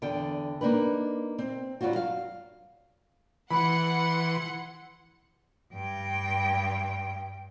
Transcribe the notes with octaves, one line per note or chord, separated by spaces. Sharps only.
E2 D3 A4 G5
A#3 D4 D#4 B4
C4
G2 A#2 F#3 F4 F#4
F5
E3 F#5 B5 C6 C#7
G2 G5